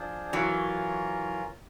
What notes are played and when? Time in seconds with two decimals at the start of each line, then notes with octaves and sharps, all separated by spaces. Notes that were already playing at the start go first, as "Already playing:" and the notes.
Already playing: F3 D4 F4 G#4 C5
0.33 E3 F#3 C#4 F4 A#4